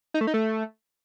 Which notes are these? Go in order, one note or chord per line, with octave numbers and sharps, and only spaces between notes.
D#4
A3
D#4
A3